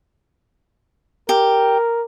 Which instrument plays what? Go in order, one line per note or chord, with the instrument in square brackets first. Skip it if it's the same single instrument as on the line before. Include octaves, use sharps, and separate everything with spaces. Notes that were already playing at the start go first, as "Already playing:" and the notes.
[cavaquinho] G4 [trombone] A#4